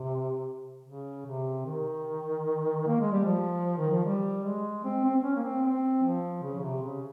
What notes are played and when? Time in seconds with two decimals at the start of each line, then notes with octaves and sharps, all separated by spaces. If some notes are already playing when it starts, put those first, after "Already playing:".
Already playing: C3
0.86 C#3
1.26 C3
1.66 D#3
2.88 A#3
3.00 G#3
3.12 G3
3.25 F3
3.77 D#3
3.91 F3
4.05 G3
4.44 G#3
4.84 C4
5.04 C4
5.15 C4
5.23 C#4
5.36 A#3
5.43 C4
5.63 C4
6.03 F3
6.42 C#3
6.58 C#3
6.62 C3
6.82 C#3